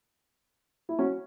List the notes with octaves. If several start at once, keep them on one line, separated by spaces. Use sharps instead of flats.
E4
C#4 F#4